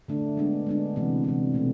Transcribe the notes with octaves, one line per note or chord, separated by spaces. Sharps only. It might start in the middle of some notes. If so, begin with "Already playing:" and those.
D3 A3 D4
G#3 B3 D4
G#3 B3 D4
C3 E3 B3
C3 E3 B3
B2 A3 C4